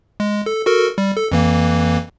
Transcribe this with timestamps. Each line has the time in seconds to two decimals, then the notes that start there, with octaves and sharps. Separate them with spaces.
0.20 G#3
0.46 A4
0.66 F#4 A4 A#4
0.98 G3
1.16 A4
1.32 F2 E3 A#3